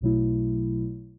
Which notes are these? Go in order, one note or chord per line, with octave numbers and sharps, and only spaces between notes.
B1 B2 F#3 A3 E4